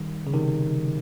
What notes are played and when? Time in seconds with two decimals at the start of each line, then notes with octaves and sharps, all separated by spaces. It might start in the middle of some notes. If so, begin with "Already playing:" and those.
Already playing: D#3 G3
0.27 C#3
0.34 C3 D#3